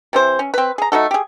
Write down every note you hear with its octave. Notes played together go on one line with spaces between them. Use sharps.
C3 E3 C5
C#4
C4 B4
G#4 A#5
A3 D#4 F#4 A4
G4 G#4